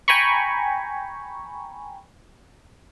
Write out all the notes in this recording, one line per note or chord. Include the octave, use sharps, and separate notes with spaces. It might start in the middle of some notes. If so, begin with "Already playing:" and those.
G5 G#5 A#5 B5 C#6